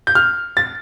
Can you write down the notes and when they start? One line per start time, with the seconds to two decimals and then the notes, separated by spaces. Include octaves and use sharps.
0.07 G6
0.15 F6
0.57 A6